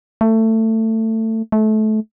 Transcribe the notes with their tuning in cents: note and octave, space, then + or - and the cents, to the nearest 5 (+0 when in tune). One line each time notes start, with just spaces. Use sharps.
A3 +20
A3 -25